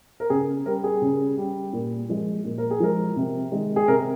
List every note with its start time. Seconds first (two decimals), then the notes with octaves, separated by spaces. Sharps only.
0.20 A#4
0.30 C#3 G#4
0.66 G3 A#4
0.84 G#4
1.02 C#3
1.37 G3
1.73 A#2
2.09 F3 G#3
2.45 A#2
2.58 A#4
2.71 G#4
2.80 F3 G#3 A#4
3.16 C3
3.52 D#3 G#3
3.76 G#4
3.88 C3 A#4